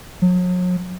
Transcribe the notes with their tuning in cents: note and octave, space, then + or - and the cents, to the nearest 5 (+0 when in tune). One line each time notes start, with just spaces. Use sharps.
F#3 -40